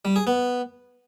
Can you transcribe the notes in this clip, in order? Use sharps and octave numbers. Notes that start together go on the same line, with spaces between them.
G3
G#4
B3